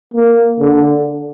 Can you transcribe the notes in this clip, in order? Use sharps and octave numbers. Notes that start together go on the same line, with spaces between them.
A#3
D3